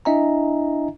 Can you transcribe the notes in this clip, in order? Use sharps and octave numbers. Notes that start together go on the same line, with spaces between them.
D4 E4 D#5 E5 G#5 A#5